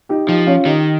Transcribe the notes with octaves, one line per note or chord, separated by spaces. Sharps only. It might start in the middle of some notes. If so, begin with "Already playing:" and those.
D#4 G4
F3 D#4 G4
C#4 F4
D#3 D#4 G4